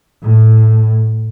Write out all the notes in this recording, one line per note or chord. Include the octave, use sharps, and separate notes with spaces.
A2